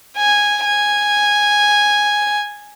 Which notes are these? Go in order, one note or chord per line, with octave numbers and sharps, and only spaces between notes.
G#5
G#5